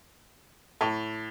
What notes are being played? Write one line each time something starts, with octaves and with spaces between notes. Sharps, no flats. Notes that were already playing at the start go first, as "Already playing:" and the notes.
A2 A5 C#6